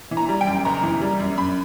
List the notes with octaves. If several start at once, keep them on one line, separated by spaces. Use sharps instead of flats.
E3
A#5
G3
G5
F#2
F#1 A#5
E3
G3
F#2
F#2 B5